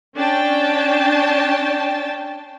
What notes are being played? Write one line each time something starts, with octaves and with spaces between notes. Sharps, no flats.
C#4 D4 G5 A5